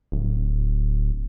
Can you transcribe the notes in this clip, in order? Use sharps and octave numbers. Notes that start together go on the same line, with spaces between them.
D1